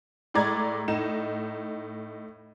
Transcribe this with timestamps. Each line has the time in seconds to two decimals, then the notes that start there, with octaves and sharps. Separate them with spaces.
0.34 A2 G#3 D5 A#5 G#6
0.88 A2 D#4 E7